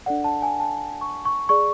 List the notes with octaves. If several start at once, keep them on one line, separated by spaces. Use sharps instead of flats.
D4 A4 D5 F#5
A5
G#5
A5
C#6
C#6
G#4 D5 C#6